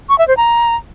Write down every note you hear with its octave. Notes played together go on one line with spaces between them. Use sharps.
C#6
E5
C5
A#5